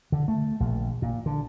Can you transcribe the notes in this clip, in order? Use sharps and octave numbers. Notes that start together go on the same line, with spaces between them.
D3
A3
A#1
A#2
D3